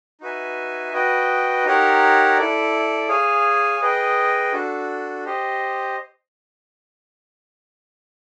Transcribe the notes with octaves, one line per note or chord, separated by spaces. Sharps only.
D#4 F#4 B4 E5 G#5
F#4 B4 D#5 G5
D#4 G4 A#4 C#5 F#5
E4 A4 D5
G#4 C#5 F5 G#5
G#4 B4 D#5 G5
D4 F#4 A4
G4 C5 D#5